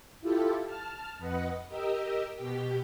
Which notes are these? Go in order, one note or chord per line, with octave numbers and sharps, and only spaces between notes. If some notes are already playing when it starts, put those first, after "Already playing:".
E4 F4 G4 A4
A5 F6
F2 B4 D#5 F#5
G4 A#4 D#5 E6
B2 G4 G5